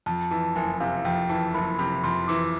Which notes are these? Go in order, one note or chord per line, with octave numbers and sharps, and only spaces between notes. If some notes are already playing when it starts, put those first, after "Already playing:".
F2 A5
E3 A5
F#1 G#5
C3 F5
F2 G5
E3 A5
F#1 B5
C3 B5
F2 C6
E3 D6